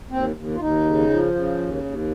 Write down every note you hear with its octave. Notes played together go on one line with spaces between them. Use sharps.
D#2 C4
D#2
F4
D#2 D#4
C#3
F3
C#3
D#2
D#2